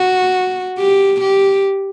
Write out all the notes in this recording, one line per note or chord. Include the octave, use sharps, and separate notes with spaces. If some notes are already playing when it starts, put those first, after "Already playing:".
Already playing: F#4
G4
G4